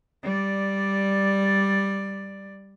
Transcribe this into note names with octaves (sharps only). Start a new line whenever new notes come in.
G3 D5